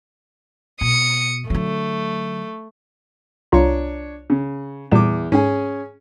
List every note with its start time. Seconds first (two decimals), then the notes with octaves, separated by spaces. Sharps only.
0.81 B2 D#6 C#7
1.50 D3 F#3 A3
3.52 C2 D4 F4 C#5 A#5
4.30 C#3
4.92 E2 A#2 G3 D6 E7
5.32 G#2 C#4 G#4 G#5